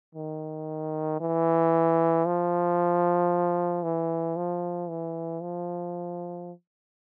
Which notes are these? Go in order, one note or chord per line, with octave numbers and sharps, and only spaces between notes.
D#3
E3
F3
E3
F3
E3
F3